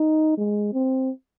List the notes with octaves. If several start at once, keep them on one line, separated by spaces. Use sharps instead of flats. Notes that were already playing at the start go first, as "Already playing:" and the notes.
Already playing: D#4
G#3
C4